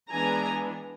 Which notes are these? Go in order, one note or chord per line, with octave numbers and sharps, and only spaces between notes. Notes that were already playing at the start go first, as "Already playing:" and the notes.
E3 G#3 B3 D4 G#5 A#5